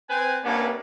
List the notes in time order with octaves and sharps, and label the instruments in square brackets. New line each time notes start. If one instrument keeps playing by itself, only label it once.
[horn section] C4 B4 G#5
G2 C3 A#3 B3 C#4 D4